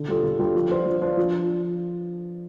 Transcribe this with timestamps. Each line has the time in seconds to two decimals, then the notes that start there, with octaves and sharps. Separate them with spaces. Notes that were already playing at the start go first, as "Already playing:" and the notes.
Already playing: D3
0.08 G3 F4 A4
0.23 D3
0.39 G3 F4 A4
0.55 F3
0.70 D4 F4 C5
0.86 F3
1.02 D4 F4 C5
1.17 F3